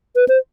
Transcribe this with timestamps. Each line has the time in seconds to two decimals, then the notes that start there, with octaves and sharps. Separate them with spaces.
0.16 B4
0.29 C5